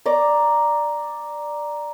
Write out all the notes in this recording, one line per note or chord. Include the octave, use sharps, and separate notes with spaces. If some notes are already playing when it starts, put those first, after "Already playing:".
D5 A#5 D6